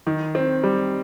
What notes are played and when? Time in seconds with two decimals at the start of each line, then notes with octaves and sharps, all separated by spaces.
0.07 D#3
0.35 C4
0.63 G3